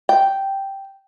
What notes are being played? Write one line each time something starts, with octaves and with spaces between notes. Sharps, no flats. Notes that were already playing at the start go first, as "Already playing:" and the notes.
G5